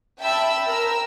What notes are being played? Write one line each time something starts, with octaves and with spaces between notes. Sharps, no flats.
E5 G5 A5 B5 E6
A#4 E6